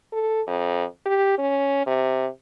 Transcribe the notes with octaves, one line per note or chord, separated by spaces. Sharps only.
A4
F2
G4
C#4
C3